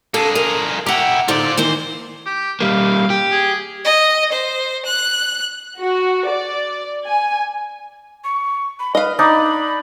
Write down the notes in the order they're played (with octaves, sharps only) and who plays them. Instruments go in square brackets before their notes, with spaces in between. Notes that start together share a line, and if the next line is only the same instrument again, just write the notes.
[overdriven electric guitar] A#3 G#4 [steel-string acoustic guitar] A4 A5
[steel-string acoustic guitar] A#4
[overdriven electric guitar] E4 G4 [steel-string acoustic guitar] F#5 A#5
[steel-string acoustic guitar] D3 D#4 C5 [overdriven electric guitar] F4 D5
[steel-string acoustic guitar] D#3 E3 A#3 [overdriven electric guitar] C5
[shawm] G4
[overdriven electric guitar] G3 A#3 [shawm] F5
[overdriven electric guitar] G4
[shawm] G#4
[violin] D#5
C5
F#6
[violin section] F#4
D5
G#5
[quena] C#6
B5
[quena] B4 [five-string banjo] D#5 F5
[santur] D4 D#4 [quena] B5